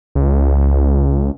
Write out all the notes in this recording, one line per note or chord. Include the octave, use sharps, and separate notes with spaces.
C#2